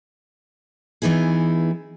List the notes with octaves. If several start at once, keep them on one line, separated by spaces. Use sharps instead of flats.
E3 B3 D#4 E4 G#4